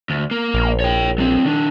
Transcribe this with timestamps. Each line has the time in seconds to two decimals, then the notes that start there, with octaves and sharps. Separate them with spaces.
0.10 D2
0.31 A#3
0.54 A#1
0.80 C#5 G5
1.18 F#3 C4
1.45 D#3 D4